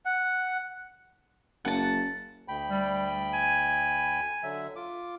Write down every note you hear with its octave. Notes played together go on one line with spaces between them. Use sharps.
F#5
F#1 F#5 A5
D2 G5 B5
G3
G#5
D3 F#3 E5
F4 D6